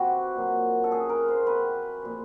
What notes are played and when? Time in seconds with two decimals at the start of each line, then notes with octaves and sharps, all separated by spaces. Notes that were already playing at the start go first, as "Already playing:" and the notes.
Already playing: C3 E3 F#4
0.36 A#2 F#3
0.84 A4
0.91 C#3 E3 G#4
1.09 A#4
1.28 C5
1.47 C3 E3 B4
2.02 A#2 F3